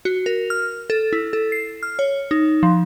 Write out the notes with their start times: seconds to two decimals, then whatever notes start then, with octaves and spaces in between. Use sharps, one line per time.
0.05 F#4
0.26 A#4
0.50 F6
0.90 A4
1.13 E4
1.33 A4
1.52 C7
1.83 F6
1.99 C#5
2.31 D#4
2.63 F3